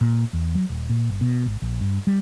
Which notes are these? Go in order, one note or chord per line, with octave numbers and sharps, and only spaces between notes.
A#2
E2
F#3
D#1
A#2
G1
B2
G#1
A#1
G2
G3